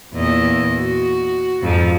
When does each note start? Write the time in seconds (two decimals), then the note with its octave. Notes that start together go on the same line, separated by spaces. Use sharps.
0.13 E2 A#2 D#5
0.77 F#4
1.62 F2 G#2 F3